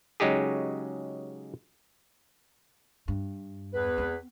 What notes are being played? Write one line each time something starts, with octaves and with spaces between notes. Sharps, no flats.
C#3 F#3 G#3 D#4 G4 G#4
G2
E2 B4
B3 C4